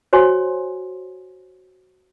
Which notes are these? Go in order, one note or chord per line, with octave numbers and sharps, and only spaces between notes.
F#4 C5 C#5 G#5 C6